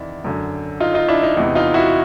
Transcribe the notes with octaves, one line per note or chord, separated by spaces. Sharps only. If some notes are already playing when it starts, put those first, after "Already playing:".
Already playing: E2 C3 D#3 D4 E4
F#2 D3
D#4 F4
D#4 F4
D4 E4
D#4
E2 C3 E3 D#4
D#4 F4
E4 F#4